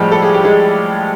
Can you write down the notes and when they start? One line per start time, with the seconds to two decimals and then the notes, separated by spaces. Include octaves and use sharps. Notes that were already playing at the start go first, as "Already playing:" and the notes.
Already playing: A2 F3 G3 G#3 G4
0.12 A4
0.22 G#4
0.34 G4
0.44 G#3 G#4